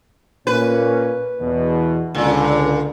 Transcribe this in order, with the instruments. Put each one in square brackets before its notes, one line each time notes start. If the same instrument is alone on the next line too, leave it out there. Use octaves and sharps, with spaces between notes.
[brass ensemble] A#2 A#3 C#4 [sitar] B4
[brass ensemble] E2 B2
[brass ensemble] C#2 D3 [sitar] A#2